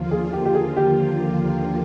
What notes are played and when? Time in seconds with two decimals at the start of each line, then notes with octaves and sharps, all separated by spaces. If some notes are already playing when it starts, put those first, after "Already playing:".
Already playing: D#2 D3 F3 A#3 F4
0.11 G#4
0.33 G4
0.45 G4
0.54 G#4
0.76 G4